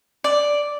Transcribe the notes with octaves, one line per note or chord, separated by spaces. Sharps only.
D5